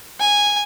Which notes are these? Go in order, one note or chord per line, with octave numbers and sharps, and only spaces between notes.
G#5